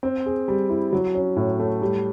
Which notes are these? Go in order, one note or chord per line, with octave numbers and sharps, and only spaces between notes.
C4
G#4
G3
E4
F#3
C#4
A2
A3
G3